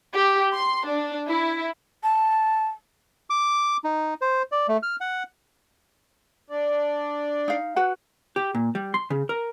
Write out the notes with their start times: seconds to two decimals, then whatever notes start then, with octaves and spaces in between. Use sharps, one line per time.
0.14 G4
0.54 C6
0.87 D4
1.29 E4
2.03 A5
3.30 D6
3.84 D#4
4.21 C5
4.52 D5
4.68 A3
4.83 F6
5.01 F#5
6.50 D4 D5
7.48 D#4 F5
7.76 F#4 B4 F#5
8.36 G4
8.55 A#2
8.75 G3
8.94 C6
9.10 C#3
9.29 A#4